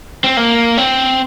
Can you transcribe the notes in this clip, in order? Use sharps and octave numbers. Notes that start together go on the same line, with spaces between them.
C4
A#3
C4